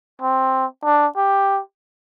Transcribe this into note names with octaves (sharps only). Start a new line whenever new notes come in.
C4
D4
G4